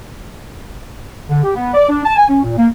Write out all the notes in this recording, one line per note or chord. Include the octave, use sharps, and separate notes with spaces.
D3
G4
B3
D5
D4
A5
G#5
C#4
A#2
A#3